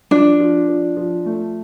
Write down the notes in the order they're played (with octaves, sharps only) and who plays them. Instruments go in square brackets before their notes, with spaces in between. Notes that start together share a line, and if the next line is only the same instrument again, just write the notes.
[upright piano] F3 [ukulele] D4
[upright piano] F3
F3
F3
A3